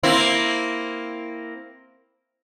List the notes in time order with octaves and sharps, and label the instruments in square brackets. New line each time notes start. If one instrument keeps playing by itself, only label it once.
[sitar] A#3 C4 E4